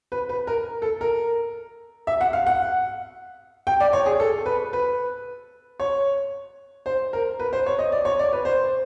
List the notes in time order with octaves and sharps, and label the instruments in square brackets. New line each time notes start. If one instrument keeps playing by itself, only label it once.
[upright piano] B4
B4
A#4
A4
A#4
E5
F#5
F5
F#5
G5
D5
C#5
G#4
A4
B4
B4
C#5
C5
A#4
B4
C5
C#5
D#5
D5
C#5
D5
B4
C5